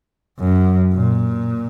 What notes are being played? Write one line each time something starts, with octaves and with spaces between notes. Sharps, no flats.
F#2
A#2